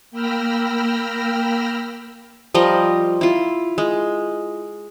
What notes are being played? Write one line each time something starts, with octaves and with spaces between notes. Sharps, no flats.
A#3 G5 B5 E6 F6 A#6
F3 G3 A#4 D#5
E4 F4
G#3